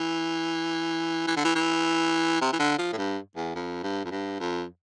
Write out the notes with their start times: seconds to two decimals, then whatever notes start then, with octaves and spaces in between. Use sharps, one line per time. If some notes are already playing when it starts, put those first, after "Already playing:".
Already playing: E3
1.27 E3
1.36 D3
1.45 E3
1.55 E3
2.41 C3
2.53 E3
2.59 D3
2.79 F3
2.93 A2
2.98 G2
3.36 E2
3.55 F2
3.83 G2
4.05 F2
4.11 G2
4.40 F2